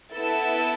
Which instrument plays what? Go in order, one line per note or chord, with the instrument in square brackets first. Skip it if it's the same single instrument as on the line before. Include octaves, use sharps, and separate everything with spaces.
[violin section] B3 E4 A4 E6